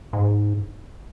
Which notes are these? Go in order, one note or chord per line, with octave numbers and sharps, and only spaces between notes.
G#2